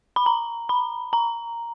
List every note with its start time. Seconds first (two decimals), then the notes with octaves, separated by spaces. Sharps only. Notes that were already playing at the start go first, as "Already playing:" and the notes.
0.16 B5
0.26 A#5
0.69 B5
1.13 A#5